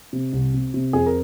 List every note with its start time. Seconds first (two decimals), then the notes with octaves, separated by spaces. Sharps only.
0.13 C3
0.33 C2
0.54 C3
0.74 C3
0.93 F2 G#4
1.06 A#4